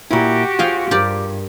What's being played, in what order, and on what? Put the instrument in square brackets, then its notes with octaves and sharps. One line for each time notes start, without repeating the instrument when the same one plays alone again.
[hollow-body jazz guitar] A#2 E4 [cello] F#4 G4
[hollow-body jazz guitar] F4 [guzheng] G#4 F5 G5
[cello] G2 [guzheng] G4 A#4 D5